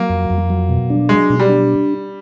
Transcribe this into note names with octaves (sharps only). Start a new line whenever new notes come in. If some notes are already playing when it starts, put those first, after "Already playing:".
Already playing: F#3 A#3
F2
F2
F#3
B2
D4
F#3 G#3
B2
G3
D4